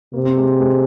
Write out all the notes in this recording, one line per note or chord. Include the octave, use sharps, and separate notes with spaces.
C3 A#3
C4
G#3
G#3